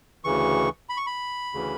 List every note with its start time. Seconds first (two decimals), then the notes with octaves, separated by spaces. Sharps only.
0.24 D2 C#3 E3 C#6
0.89 B5
0.97 C#6
1.06 B5
1.53 D2 C#3 E3